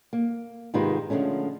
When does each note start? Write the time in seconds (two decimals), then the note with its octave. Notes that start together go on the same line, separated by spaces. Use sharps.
0.13 A#3
0.74 G#2 C3 D#3 G#3 F4 B4
1.10 D3 F3 G#3 A3 C#4